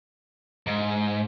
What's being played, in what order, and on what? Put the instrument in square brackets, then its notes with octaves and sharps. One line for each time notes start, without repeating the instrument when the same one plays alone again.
[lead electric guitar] G#2